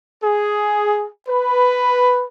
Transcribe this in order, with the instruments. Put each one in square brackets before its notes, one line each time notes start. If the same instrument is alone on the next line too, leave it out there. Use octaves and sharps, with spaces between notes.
[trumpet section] G#4
B4